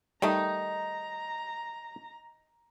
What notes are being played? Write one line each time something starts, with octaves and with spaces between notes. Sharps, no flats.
D#3 G3 A3 D#4 A#5